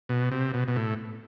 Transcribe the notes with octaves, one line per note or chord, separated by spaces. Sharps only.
B2
C3
B2
B2
A2